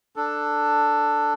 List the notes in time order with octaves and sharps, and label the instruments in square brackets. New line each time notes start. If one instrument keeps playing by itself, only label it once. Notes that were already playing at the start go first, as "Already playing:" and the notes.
[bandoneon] D4 A4